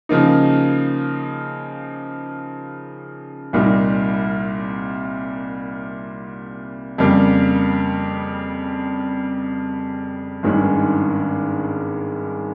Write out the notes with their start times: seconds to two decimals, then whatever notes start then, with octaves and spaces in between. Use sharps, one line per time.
0.09 C#3 F3 A#3 D#4
3.53 C2 A#2 G3 A#3 D#4
6.98 F2 C#3 G3 A#3
10.43 G#1 G2 D#3 G#3 C#4